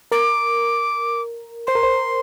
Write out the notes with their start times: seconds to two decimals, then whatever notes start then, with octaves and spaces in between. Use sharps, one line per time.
0.12 A#4 D6
1.67 C5 C6
1.75 A#4
1.83 C5